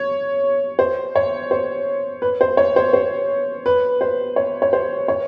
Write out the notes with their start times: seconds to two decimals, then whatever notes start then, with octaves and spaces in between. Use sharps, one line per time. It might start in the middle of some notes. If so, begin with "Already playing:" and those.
Already playing: C#5
0.79 C5
1.16 C#5
1.51 C5
2.22 B4
2.41 C5
2.57 C#5
2.76 C5
2.93 C5
3.66 B4
4.01 C5
4.36 C#5
4.62 C#5
4.73 C5
5.08 C#5